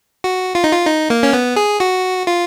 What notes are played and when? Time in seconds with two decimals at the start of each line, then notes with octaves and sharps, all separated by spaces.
0.24 F#4
0.55 F4
0.64 D#4
0.72 F4
0.87 D#4
1.10 A#3
1.23 C#4
1.33 B3
1.56 G#4
1.80 F#4
2.27 F4